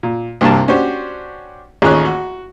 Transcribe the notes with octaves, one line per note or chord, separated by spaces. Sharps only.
A#2
C2 G2 C3 A#3 A5
C#4 D4 F#4 G4 C5
A1 D#2 F4 G#4 C#5 F#6
F#4